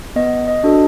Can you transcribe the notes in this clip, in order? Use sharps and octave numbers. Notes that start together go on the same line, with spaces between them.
B3 D#5
D#5
D4 F#4 A4